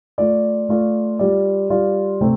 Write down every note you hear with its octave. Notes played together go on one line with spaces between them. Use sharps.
A3 F4 D5
A3 F4 D5
G3 F4 D5
G3 F4 D5
C3 A3 C4